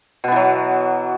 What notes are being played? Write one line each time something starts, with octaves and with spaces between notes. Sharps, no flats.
B2 E3 F#3 B3